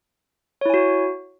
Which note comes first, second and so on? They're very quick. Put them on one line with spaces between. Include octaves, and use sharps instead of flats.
C#5 E4 G#5 F#4